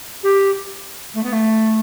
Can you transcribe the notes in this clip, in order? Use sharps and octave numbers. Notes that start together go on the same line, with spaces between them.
G4
A3
B3
A3